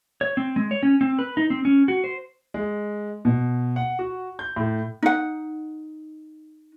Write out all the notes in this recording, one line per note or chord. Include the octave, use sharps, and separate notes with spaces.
C#5
C4
G#3
C#5
C#4
C4
B4
D#4
C4
C#4
F#4
C5
G#3
B2
F#5
F#4
G6
A2
D#4 F#5